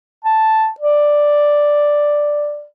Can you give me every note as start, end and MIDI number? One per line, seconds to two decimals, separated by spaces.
0.25 0.69 81
0.80 2.65 74